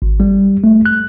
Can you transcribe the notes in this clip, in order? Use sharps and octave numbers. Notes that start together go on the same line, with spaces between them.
G#1
G3
A3
F#6